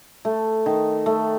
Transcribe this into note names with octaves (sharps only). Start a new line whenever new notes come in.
A3
D#3
A3